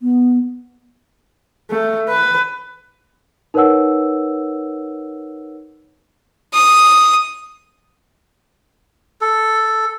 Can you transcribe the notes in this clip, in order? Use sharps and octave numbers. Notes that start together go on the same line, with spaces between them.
B3
A3
B4
D#4 A#4 B4 C#5 F#5 E6
D#6
A4